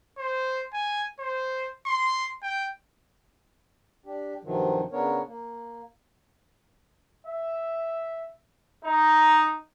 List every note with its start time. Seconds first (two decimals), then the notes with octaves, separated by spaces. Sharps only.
0.18 C5
0.73 G#5
1.19 C5
1.86 C6
2.42 G5
4.06 D4 G4
4.44 G2 C3 D#3 F3 F#3
4.92 C#3 B3 D4 A#4 C#5
5.27 A#3
7.25 E5
8.84 D#4